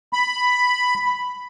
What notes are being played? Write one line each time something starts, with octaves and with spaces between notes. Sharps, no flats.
B5